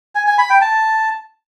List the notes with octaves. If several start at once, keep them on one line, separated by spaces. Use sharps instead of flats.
G#5
G#5
B5
G5
A5